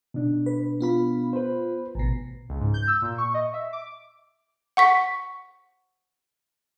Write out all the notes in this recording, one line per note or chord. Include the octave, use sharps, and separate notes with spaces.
B2 D4
B4
B3 F4 B5
B4 C5
A1 B2
C#2
G#2
G6
E6
A#2
C#6
D#5
E5
D6
F#5 C#6 B6